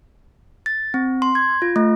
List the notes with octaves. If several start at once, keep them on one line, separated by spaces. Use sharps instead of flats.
A6
C4
C6
G#6
F4
A3